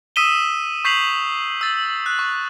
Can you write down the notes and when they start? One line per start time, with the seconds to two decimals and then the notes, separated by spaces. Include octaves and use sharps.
0.16 D#6 E6 B6 D#7 E7 G7
0.85 C#6 G6 B6 C7 F7 F#7
1.61 E6 A6
2.06 F#6
2.19 C#6